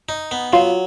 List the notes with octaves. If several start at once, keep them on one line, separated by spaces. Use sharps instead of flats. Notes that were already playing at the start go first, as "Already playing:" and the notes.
D#4
B3
F#3 F4